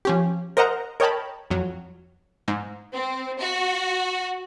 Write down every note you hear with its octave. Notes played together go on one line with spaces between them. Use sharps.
F3 C#4 G4
A#4 C5 D#5 F#5 A#5
A#4 C#5 D#5 G5 A5 B5
F2 F#3
G#2
C4
F#4